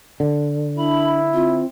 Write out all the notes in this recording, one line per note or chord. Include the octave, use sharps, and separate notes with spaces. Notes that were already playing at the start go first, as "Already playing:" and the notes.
D3
D4 E4 B5
C4 F4